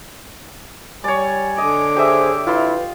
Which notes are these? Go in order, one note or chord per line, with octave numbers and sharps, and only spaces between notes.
G3 C#5 D5 G#5
D3 D#5 D6
G4 G#4 C5 D#5 E5
E4 F4 B4 C6